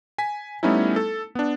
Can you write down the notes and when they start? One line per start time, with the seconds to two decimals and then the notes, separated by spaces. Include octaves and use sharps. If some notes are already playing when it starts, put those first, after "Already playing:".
0.18 G#5 B6
0.63 G3 A3 B3 C#4 D#4 E4
0.96 A4
1.35 B3 D4